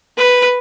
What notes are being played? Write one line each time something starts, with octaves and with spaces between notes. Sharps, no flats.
B4